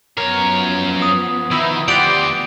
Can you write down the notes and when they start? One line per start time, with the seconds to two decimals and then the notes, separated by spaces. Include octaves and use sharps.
0.18 F#2 F3 B3 A#4 C#5
1.02 D#6
1.52 D#3 E4
1.88 D2 G4 C5 D5 F#5 D7 F7